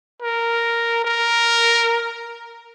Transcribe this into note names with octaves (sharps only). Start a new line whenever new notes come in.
A#4
A#4